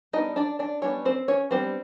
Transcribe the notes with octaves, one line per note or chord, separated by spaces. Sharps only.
G3 B3 D4 D#4 D#5
D4 D5
D4 D5
G3 B3 C#4 D4 C#5
C4 C5
C#4 C#5
G3 B3 C4 D4 C5